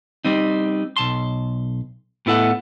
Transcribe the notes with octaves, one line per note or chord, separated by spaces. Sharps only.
G3 C4 D#4
B1 A5 C6
A2 B3 E4 A4 F#5